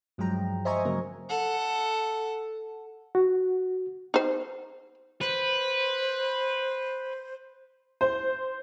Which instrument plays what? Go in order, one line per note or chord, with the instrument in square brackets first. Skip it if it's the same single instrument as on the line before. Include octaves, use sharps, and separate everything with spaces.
[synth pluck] G2 F3 F#3 G#3 G5 A#5
C5 D#5 E5 G#5 A#5 C#6
C#3 F#3 A#3 A#4
[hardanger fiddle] A4 F#5
[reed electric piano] F#4
[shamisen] D#4 C5
[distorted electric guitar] B4 [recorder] C5
[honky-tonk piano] C5